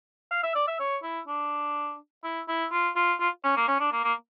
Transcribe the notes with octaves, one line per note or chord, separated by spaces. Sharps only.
F5
E5
D5
E5
C#5
E4
D4
E4
E4
F4
F4
F4
C#4
A#3
C#4
D4
A#3
A#3